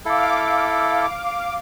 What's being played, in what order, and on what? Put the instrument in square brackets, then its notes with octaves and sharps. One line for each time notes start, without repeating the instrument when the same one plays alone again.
[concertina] E4 A4 [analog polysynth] F5 D6